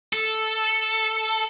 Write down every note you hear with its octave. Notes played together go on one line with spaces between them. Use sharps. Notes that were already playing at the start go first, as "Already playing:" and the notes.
A4